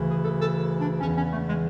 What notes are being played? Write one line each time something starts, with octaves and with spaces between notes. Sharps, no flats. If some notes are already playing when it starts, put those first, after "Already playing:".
Already playing: D2 C#3 E3
G#4
A4
A4
D4
E2 C#3 E3 C#4
C#4
A3
G#3